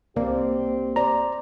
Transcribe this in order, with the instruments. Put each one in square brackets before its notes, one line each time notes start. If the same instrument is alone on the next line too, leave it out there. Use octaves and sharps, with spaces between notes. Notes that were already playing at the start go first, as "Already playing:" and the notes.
[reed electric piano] C2 A#3 [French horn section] C4 G4 [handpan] D5
[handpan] C5 D5 [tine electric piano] A#5